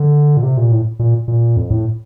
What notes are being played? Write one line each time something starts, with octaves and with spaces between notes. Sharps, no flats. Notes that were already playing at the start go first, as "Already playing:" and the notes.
Already playing: D3
A#2
C3
A#2
A2
A#2
A#2
F2
A2